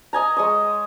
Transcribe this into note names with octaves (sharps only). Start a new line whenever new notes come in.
D#5 G#5 A#5
G#3 C#5 D#6